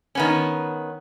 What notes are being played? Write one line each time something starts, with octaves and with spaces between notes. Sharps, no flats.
D#3 B3 C#4